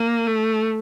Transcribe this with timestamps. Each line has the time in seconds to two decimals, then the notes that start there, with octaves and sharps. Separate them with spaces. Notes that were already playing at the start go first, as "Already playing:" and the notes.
Already playing: A#3
0.27 A3